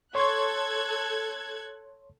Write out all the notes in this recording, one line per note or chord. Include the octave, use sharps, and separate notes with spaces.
A4 C#5 C6 C#6 F#6 G#6